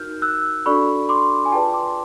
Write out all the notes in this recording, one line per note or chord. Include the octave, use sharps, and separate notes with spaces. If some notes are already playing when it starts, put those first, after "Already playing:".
Already playing: D#4 F#4 A#4 F6 G6
E6 F#6
D4 F#4 A4 D5 B5 C#6
C6 D6
G#5
F4 G#4 B4 D5 G5 A5
C6 D6